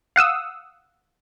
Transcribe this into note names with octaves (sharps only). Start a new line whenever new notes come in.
F5 F#5 D#6 E6